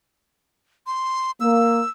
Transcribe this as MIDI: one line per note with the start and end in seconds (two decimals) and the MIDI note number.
0.87 1.31 84
1.40 1.81 58
1.40 1.90 88